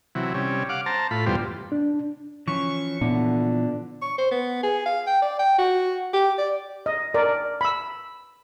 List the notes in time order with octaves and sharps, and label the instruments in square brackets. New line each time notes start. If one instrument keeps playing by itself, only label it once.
[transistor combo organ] C3 E3 F#3
C3 G3 C#4
F5 F#5 D6
C5 A5 A#5
A2 F4 B5
E2 G2 B2 G3 F4 C5
[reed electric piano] D4
[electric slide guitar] E3 F3 [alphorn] C#4 [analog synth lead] C#6
[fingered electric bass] A#2 B3 [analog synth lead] D3 [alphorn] E4
[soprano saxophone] C#6
C5
B3
G#4
F5
G5
D5
G5
F#4
G4
D5
[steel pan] D#5
A#4 D5
B5 E6